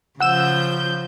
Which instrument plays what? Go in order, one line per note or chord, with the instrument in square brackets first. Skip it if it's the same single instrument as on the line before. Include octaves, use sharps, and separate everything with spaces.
[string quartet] C#3 F3 G6 [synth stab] F#5 E6 E7